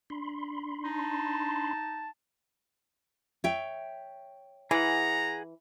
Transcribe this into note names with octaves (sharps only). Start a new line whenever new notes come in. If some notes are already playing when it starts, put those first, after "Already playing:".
D4 B5 C6
D#4 A5
C#5 E5 G5
E3 G#4 F#5 A#5